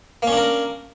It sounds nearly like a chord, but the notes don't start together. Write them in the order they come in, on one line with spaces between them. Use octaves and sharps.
A#3 C#4 D4 A#4